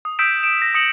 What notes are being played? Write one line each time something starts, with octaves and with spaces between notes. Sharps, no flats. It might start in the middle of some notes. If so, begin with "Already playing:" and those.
D#6
D#6 E6 G6 B6 D7 E7
D7 E7
A#6
D#6 A#6 C#7 E7 F#7